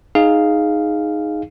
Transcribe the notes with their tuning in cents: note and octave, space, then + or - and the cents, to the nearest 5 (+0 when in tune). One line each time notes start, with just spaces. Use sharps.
D#4 +0 G#4 +0 F5 +0